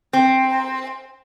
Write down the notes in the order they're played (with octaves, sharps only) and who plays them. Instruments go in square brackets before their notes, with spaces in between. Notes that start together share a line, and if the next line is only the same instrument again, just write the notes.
[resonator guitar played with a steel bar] C4